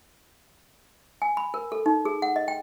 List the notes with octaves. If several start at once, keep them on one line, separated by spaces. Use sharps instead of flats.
G#5
B5
A#4
A4
D#4
G#4
F#5
D#5
G5